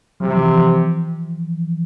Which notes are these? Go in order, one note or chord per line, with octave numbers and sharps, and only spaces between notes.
C3 F#3
F3
E3
F3